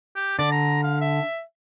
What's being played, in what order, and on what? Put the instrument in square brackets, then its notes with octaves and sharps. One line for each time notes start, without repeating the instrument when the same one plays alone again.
[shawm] G4
[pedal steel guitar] D3 [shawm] D5
[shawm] A#5
F5
E5